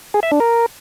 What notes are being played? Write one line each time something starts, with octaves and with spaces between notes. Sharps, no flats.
G#4
E5
D4
A#4